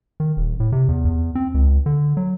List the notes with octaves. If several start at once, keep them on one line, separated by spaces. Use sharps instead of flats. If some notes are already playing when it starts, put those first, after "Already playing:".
D#3
D#1
A2
C3
E2
E2
C4
C#2
D3
F#3